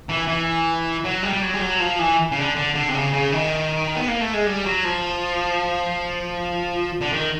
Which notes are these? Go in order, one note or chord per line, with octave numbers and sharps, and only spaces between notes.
E3
E3
F#3
G3
G3
F#3
G3
F#3
F3
E3
C#3
D3
D3
D3
C3
C#3
C#3
D#3
B3
A#3
A3
G#3
G3
F#3
F3
D3
D#3